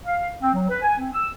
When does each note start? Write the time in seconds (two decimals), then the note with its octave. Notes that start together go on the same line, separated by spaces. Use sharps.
0.06 F5
0.41 C4
0.54 F#3
0.68 B4
0.82 G#5
0.98 C4
1.12 E6